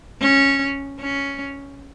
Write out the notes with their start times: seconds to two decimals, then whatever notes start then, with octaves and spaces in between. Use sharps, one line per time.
0.21 C#4
1.00 C#4